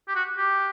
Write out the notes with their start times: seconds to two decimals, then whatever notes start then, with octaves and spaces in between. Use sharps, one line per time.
0.08 G4
0.15 F#4
0.38 G4